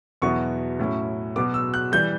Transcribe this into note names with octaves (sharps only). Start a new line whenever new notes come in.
E2 B2 F#3 B3 E4 C#6
A2 F#3 C#4 E4
B2 F#3 B3 D6
E6
F#6
E3 G3 G6